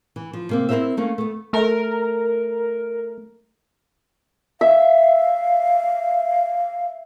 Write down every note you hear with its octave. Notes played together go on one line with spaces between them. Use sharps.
E3
F3
C3 A#3 C4
C4 E4 F4 A#4 C5 E5
A3 A#3 C#4
A3 B3
A3 A#4
E5 F5